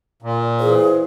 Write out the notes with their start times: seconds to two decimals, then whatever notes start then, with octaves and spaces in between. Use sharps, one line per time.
0.22 A#2
0.60 E3 E4 G#4 C5